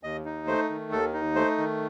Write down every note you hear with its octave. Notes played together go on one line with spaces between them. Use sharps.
D#2 D#5
D#4
A3 C5
D#3
D#2 A4
D#4
A3 C5
D#3